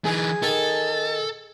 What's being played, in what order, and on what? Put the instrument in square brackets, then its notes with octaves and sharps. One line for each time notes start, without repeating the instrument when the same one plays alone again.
[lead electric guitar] E3 D#4 [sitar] G#4
[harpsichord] D#3 [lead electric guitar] A4